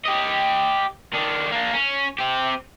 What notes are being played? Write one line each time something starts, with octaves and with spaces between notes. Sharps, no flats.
G4 D#5
D#3 D4
A#3 D4
C#4
C4 G4